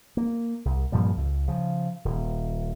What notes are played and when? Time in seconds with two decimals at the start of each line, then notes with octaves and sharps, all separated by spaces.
0.17 A#3
0.65 C2
0.92 G2 A#2 F3 G3
1.17 C#2
1.48 C#3 F3
2.05 D#1